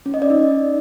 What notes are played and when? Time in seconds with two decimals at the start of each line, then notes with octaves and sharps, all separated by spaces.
0.06 C#4
0.14 D#5
0.22 D5
0.30 D#4